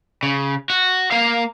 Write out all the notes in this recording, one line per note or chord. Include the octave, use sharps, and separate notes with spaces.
C#3
F#4
A#3 F5